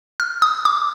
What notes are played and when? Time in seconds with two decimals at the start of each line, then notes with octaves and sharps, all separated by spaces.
0.20 F6
0.42 D#6
0.65 D6